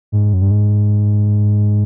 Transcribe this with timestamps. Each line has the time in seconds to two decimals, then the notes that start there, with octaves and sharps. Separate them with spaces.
0.12 G#2
0.33 F#2
0.42 G2
0.51 G#2